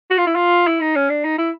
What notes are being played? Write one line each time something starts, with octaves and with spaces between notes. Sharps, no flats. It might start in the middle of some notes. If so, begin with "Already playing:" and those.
F#4
F4
E4
F4
E4
D#4
C#4
D4
D#4
E4